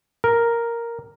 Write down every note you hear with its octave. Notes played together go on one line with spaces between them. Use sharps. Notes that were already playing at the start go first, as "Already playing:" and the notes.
A#4